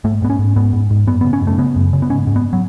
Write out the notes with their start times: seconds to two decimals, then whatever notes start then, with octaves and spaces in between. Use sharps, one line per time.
0.04 G#2 A3
0.22 G#2 B3
0.30 C#4
0.39 G#2
0.56 G#2 B3
0.73 G#2
0.91 G#2
1.07 F#2 B3
1.21 C#3 B3
1.33 C#4
1.42 F#2
1.47 A3
1.58 C#3 B3
1.76 F#2
1.93 C#3
2.02 B3
2.10 G#2 C#4
2.27 G#2
2.36 B3
2.53 F#3